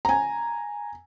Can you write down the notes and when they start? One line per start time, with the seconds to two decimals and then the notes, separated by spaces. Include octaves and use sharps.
0.05 G#5 A#5